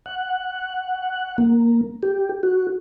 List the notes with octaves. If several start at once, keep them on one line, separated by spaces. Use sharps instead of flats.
F#5
A#3
G4
F#4